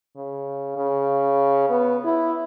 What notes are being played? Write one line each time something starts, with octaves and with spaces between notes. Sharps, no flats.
C#3
C#3
B3
E4